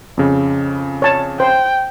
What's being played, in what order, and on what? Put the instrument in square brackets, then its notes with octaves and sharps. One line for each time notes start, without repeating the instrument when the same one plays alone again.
[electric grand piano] F2 C#3
[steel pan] C#5 A5
[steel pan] C5 [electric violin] G5